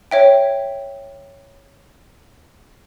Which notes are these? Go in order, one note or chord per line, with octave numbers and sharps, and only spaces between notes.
C#5 E5 G5